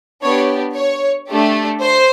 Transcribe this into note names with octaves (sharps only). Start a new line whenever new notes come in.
B3 D4 G4 C#5
C#5
A3 D4 G4
C5